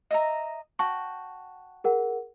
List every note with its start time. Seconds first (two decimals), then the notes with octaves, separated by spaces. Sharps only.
0.11 D#5 E5 A#5
0.79 F#4 G5 A5 C#6
1.84 G#4 A#4 F#5